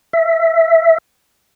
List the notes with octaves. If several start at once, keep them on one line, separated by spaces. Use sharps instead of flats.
E5